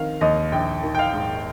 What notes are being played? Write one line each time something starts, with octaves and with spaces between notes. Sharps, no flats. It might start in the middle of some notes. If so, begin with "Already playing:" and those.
Already playing: D#3 C4 F5
D#2 D#5
A#1 G5
D#3
G5
F5
G#2